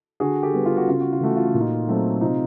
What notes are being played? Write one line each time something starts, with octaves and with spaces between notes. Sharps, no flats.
D3 F#4 G#4
G4 A4
G3 B3
F4
F#4
C#3 F4
F#4
F4
E3 A3 F#4
F4
F#4
A#2
D#4 F4
F#3 A3 C4
C3 D#4 F4